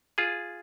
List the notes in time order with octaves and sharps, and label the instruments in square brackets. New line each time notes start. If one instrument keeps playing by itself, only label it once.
[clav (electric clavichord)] F4 G#4